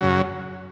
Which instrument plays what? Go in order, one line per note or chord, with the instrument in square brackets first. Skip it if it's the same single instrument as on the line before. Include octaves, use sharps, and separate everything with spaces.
[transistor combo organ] F#2 C#3 F#3